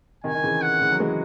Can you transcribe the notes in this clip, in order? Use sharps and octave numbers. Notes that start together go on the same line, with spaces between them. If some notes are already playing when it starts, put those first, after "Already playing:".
C3 D#3 G#5
D#3
C#3 E3
F#5
C#3 E3
F#3
E3 G#3